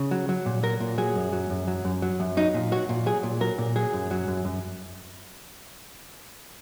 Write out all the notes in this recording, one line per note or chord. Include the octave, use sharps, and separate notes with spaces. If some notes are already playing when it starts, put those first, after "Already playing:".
Already playing: C#3
F#3
F#3
A#2
F#3 A#4
A#2
F#3 G#4
F#2
F#3
F#2
F#3
F#2
F#3
F#2
F#3 D#4
A#2
F#3 F#4
A#2
F#3 G#4
A#2
F#3 A#4
A#2
F#3 G#4
F#2
F#3
F#2
F#2